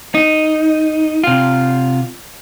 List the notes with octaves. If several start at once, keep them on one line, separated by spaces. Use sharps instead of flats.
D#4
C3 F4